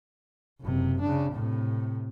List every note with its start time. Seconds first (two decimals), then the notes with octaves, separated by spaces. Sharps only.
0.61 F#1 C3
1.01 C#3 D4
1.33 A2 C3